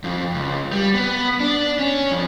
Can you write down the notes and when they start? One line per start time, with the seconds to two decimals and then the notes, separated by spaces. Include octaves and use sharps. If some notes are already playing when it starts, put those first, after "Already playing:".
0.04 F2
0.34 C#2
0.72 G3
0.94 B3
1.40 D4
1.79 C#4
2.11 F2